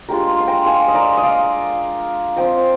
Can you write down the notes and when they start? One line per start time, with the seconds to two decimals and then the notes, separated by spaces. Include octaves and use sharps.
0.09 G#3 D4 F4 G4 A#4
0.40 C6
0.47 G5 A#5
0.66 F5 G#5
0.88 D#5
0.95 A#4 D5
1.17 D#5
1.23 D5 F5
2.37 F3 C4 F4 D#5 G5